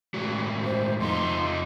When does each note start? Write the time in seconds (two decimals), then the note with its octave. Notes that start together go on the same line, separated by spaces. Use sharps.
0.14 A2 G#3 F#4
0.65 C5
1.00 F2 D#4 C6